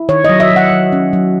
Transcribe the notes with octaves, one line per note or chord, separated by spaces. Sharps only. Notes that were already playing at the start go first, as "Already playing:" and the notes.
Already playing: E4
D#3 C#5
F#3 D#5
E5
F#3
F#5
F#3
C#4
F#3